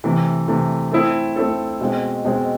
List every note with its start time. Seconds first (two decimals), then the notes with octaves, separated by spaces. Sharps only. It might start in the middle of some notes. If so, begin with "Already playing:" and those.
0.04 C3 E3 A3
0.48 C3 E3 A3
0.92 A3 C4 E4 A4
1.36 A3 C4 E4 A4
1.81 B2 G#3 C4
2.25 B2 G#3 C4